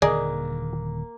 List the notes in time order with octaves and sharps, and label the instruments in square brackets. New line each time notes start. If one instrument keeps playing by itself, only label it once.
[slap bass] D#1 D3 D#3 [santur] A#3 [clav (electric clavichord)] G#4 D#5 [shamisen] D5